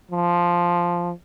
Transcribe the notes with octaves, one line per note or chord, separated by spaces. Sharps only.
F3